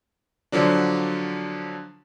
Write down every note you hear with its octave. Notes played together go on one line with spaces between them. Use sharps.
D3 F3 F#3 D4